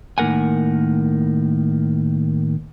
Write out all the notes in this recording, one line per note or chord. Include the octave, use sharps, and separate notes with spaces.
A2 D#3 A#3 A#4 F#5 G#5